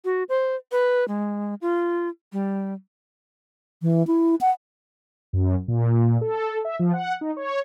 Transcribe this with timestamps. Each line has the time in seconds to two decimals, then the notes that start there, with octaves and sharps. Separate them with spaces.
0.05 F#4
0.29 C5
0.72 B4
1.08 G#3
1.61 F4
2.33 G3
3.82 E3
4.07 E4
4.41 F#5
5.33 F#2
5.68 A#2
6.21 A4
6.65 E5
6.79 F3
6.93 F#5
7.21 D#4
7.37 C#5